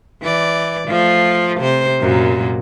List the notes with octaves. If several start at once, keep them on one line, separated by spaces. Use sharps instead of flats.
E3 D5
F3 A3 F4
C3 C5
F#2 A#2 F#3